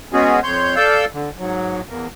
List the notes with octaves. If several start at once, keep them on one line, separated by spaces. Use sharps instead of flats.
G#3 B3 C#4 F#4 G#4
F2 C#5 C6 G6
A4 D5 F5 E6 G6
D3
G#2 F#3
E2 A#3